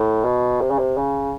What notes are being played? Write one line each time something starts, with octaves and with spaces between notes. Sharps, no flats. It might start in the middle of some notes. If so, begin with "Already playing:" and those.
Already playing: A2
B2
C3
C#3
C3
C#3